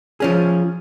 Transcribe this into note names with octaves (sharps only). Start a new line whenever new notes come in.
F3 C#4 G#4